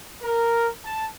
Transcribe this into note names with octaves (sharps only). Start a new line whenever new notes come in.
A#4
A5